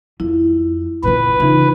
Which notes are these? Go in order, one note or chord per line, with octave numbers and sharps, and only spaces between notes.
F2 E4
A#2 D3 B4
C#3 E3 D#4 F4